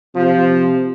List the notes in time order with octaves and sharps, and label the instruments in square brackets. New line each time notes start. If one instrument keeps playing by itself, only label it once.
[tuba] C3 [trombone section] F3